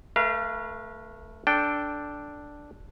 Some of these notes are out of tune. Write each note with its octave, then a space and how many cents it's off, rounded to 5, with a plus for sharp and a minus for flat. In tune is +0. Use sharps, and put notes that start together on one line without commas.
A3 +0 B4 -45 F5 -30
D4 +0 A4 +0 G5 -5